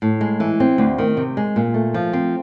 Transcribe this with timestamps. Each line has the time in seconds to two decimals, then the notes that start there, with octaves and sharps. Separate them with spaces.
0.02 A2
0.21 G#3
0.40 E3
0.60 C4
0.78 D2
0.98 D#3
1.17 C3
1.37 G#3
1.56 A#2
1.74 A3
1.94 F3
2.13 C4